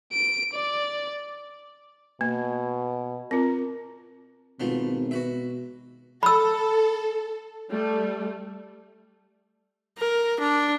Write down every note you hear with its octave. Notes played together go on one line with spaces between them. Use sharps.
D7
D5
B2 A#3
C4 F4 A#4
G#1 B2 F3 A3 B3
F#4 B4 E5
A4 B5 E6
G3 A3
A#4
D4